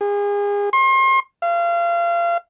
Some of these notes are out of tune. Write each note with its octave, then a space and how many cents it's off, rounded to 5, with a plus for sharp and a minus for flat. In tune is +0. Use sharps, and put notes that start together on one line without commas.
G#4 -35
C6 +35
F5 -30